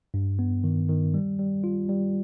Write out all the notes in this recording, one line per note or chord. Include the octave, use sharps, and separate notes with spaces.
G2
B3
D#3
D#3
G3
G3
F4
G3